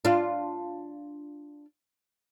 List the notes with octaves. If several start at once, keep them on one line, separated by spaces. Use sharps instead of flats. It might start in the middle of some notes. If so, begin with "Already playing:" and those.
D4 F4